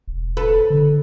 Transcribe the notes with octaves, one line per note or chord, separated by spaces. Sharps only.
E1
A4 B4
D3